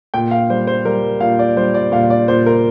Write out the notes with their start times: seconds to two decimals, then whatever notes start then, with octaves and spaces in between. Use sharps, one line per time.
0.14 A#2 G5
0.31 F5
0.50 G3 C5
0.67 C5
0.85 G3 A#4
1.20 A#2 F5
1.39 D5
1.56 G3 C5
1.74 D5
1.92 A#2 F5
2.10 D5
2.28 A#2 C5
2.46 A#4